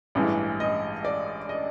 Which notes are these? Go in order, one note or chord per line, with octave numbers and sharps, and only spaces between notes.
A1 G2 E3 G#3
D#5
D5
D#5